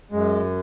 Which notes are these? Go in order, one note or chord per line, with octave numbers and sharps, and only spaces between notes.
F#2 G#3